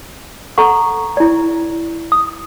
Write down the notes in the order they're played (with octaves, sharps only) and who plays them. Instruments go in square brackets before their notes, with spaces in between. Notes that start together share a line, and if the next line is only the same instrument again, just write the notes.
[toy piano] A4 F#5 [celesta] A#5 C#6
[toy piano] E4 D5
[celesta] D#6